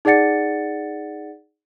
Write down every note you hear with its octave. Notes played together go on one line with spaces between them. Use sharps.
D#4 G#4 D5 F#5 A6 C#7